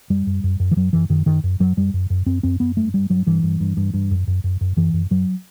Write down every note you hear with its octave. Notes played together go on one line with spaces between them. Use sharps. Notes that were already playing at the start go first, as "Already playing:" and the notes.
F#2 G3
F#2
F#2
F#2
E3
F#2 F#3
F#2 E3
F#2 D#3
F#2 D#3
F#2
F#2 F#3
F#2 G3
F#2
F#2
F#2 C4
F#2 C4
F#2 B3
G2 A3
G2 G3
G2 F#3
G2 E3
G2
G2
G2
G2
F#2
F#2
F#2
F#2
F#2 E3
F#2
F#2 F#3